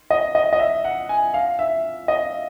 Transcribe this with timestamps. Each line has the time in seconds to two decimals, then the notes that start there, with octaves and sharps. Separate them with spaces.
0.11 D#5
0.35 D#5
0.53 D#5
0.59 E5
0.84 F#5
1.09 G#5
1.34 F5
1.59 E5
2.08 D#5